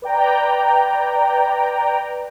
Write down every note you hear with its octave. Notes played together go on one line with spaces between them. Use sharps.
B4 D5 G5 A#5